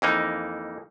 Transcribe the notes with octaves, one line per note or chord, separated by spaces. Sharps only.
F2 E3 A#3 D#4